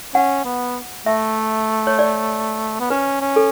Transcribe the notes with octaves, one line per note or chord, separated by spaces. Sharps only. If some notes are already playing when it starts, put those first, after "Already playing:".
C#4 F#5
B3
A3 E5
C#5
D5
B3
C#4 B4
C#4
A4